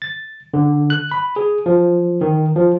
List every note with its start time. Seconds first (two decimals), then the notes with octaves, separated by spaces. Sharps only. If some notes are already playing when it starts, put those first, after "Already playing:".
0.02 A6
0.54 D3
0.90 F#6
1.11 B5
1.36 G#4
1.66 F3
2.21 D#3
2.56 F3